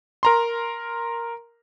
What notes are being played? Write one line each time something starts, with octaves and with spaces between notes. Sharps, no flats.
A#4 A#5 C6